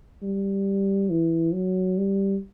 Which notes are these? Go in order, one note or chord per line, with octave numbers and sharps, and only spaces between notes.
G3
E3
F#3
G3